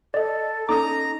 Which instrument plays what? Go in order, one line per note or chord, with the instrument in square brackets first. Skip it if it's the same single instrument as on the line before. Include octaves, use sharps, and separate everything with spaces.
[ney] A4 [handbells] D5 D#5
[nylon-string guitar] C#4 D#4 [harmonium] A#5 [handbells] D6 D#6